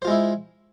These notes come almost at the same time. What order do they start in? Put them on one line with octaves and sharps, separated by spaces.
C5 F4 G#3 E4